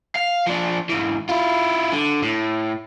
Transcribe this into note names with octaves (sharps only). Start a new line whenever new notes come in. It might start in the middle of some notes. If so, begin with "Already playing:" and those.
F5
F3 D4
G#2 E3
E4 F4
D3
A2